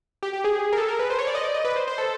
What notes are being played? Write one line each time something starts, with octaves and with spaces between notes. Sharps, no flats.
G4
G4
G#4
A#4
A4
A#4
B4
C5
C#5
D5
D#5
D5
D#5
B4
C5
C5
A4